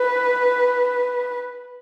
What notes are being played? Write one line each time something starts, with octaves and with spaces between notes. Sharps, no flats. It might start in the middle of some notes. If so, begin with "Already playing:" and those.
Already playing: B4